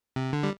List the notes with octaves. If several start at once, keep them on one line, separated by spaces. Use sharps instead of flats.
C3
D3
G3